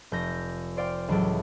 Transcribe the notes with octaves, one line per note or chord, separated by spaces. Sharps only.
F1 G6 A#6
C5 D5 F5 G5
C#2 A2 E3 F#3 G4 A4